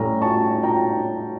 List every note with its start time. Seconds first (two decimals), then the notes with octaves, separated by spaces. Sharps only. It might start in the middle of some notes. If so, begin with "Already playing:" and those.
Already playing: A2 G3 C#4 G5 A#5
0.21 A5 C#6
0.63 G5 A#5